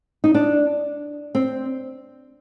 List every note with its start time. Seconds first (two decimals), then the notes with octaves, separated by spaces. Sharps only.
0.24 D#4
0.34 D4
1.35 C4